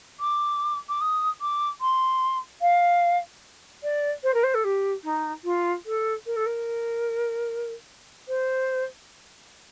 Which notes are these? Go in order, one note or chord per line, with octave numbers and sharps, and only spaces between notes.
D6
D6
D#6
D6
C6
F5
D5
C5
A#4
C5
A4
G4
D#4
F4
A4
A#4
A4
A#4
C5